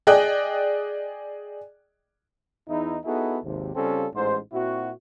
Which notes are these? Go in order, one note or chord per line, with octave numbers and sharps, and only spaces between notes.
G#4 D5 D#5 G5 F#6
E2 D#4 E4
B3 D#4 E4 F#4 G#4 A4
G#1 D#2 C3
C#3 G3 C4 C#4 F4 A4
A1 G#2 C5
A#2 C4 E4 F#4